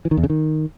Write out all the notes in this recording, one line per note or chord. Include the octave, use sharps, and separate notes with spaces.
E3
D#3
E2
C#3
D#3